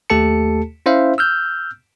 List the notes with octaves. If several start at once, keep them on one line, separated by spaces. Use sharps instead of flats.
D#2 A3 G4 A4 A5 C#7
C#4 E4 C5 E5 F5
E6 F6 G6